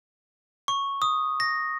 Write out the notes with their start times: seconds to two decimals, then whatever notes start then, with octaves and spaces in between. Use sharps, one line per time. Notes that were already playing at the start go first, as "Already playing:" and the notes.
0.68 C#6
1.02 D#6
1.40 A#6